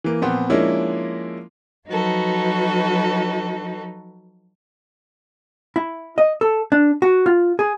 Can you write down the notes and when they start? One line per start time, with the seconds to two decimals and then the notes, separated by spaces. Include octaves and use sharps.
0.04 E3 A#3
0.22 A#2 F3 B3 C4
0.50 F3 G#3 A#3 C#4 D4 E4
1.88 F3 F#3 D#4 F#4 A4 B4
5.76 E4
6.18 D#5
6.41 A4
6.72 D4
7.02 F#4
7.26 F4
7.59 G#4